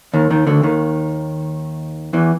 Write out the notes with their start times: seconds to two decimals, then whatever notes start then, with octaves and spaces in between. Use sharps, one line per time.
0.14 D#2 D#3
0.30 D#2 D#3
0.47 D2 D3
0.63 D#2 D#3
2.13 E2 E3